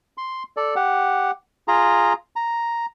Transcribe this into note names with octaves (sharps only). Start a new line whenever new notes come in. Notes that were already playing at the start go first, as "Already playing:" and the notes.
C6
A4 D5
G4 F#5
F4 G#4 A#5
A#5